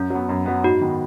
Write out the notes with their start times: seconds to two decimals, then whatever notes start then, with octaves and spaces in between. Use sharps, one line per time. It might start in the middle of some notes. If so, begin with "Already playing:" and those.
Already playing: F#2 C#4
0.10 F#3 B3
0.29 F#2
0.46 F#3 B3
0.64 G#2 F#4
0.81 D#3 B3